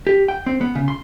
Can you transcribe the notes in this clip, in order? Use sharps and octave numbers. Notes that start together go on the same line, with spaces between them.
G4
G5
C4
B3
C#3
C6